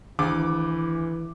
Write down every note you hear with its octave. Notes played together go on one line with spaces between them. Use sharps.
D2 D#3 E3 D6